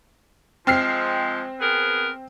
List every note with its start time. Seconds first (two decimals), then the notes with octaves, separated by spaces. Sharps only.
0.67 F3 G#3 C4 F6 C7
1.59 B3 G#4 A#4